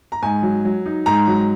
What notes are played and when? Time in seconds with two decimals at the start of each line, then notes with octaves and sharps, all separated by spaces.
0.12 A#5
0.22 G#2 G#5
0.43 F#3
0.65 F#3
0.86 D#4
1.06 G#2 A#5
1.28 F#3